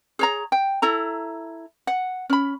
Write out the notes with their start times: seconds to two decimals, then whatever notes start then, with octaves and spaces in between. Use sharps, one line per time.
0.19 G#4 C#5 A#5
0.52 G5
0.82 E4 A4 A#5
1.87 F#5
2.30 C#4 B5